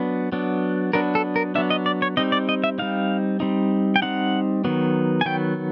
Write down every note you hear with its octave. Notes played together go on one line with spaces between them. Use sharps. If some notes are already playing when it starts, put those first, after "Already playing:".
Already playing: F#3 B3 D4
F#3 B3 D4
F#3 B3 D4 A#4
A4
A#4
F#3 B3 D4 E5
D#5
D5
C#5
G3 C4 D#4 D#5
D5
D#5
E5
G3 C4 D#4 F5
G3 C4 D#4
G5
G3 C4 D#4 F#5
D#3 F#3 B3
G#5
D#3 F#3 B3 G5